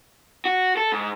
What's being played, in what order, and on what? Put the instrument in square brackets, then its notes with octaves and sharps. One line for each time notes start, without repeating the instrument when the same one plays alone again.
[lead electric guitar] F#4
A4
G#2